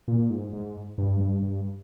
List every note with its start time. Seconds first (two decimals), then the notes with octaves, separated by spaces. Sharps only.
0.08 A#2
0.30 G#2
0.53 G#2
0.98 G2
1.20 G2
1.43 G2